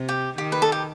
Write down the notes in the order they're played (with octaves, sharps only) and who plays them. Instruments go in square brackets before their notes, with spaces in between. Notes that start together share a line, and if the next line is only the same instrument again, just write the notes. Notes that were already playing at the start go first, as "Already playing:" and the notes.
Already playing: [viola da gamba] C3
[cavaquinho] G4
[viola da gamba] D#3 [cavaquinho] G4
[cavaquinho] B4
A4
G4